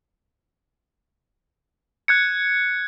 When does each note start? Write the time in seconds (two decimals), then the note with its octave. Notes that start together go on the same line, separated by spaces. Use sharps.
2.08 F#6 G#6 C#7